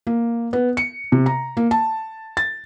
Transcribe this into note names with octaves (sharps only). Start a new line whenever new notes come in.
A#3
B3
C#7
C3
A#5
A#3
A5
A6